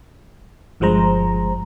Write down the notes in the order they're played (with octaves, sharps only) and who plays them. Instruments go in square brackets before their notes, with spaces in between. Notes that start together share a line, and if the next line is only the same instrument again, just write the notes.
[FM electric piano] G1 G2 F3 G#3 C5 A#5